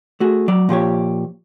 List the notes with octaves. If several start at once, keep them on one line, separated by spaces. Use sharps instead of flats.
A3 F#4 G#4
F#3 D5
A#2 F3 G4 C#5